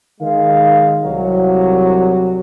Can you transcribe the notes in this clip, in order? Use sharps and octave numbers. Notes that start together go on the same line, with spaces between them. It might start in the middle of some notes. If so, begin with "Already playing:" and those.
D#3 G#3 F5
C2 F#3